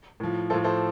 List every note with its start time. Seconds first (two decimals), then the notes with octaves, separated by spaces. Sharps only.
0.20 A2 F3
0.50 F3 A4 C5
0.54 A2
0.64 A4 C5